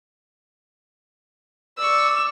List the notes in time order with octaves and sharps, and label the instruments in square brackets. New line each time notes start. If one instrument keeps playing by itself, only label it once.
[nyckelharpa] D5 C#6 [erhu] E6